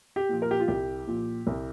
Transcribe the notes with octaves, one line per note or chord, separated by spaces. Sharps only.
G4
A#2 F3
A#4
G4
F4
C2 G4
A#2 F3
C2